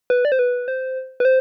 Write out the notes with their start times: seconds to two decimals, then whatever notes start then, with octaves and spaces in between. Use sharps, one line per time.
0.10 B4
0.25 D5
0.32 C5
0.39 B4
0.68 C5
1.20 B4
1.25 C5